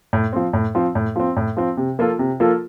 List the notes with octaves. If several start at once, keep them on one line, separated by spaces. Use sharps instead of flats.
A2
F3 C4
A2
F3 C4
A2
F3 C4
A2
F3 C4
C3
F3 A#3 F4 A4
C3
F3 A#3 F4 A4